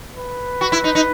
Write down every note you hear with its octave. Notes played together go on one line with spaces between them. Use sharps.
B4
F#4
E4
D#4
D#4